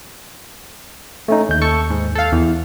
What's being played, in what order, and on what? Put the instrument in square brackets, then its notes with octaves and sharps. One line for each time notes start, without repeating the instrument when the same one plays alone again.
[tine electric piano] A3 C#4 D#4
D#2 G6
[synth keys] A4 C#6
G#2
A4 F5
E2